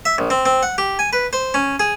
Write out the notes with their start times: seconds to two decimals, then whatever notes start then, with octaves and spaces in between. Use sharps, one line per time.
0.05 E5
0.18 A#1
0.30 C4
0.46 C4
0.63 F#5
0.78 G4
0.99 G#5
1.13 B4
1.33 C5
1.54 C#4
1.80 G#4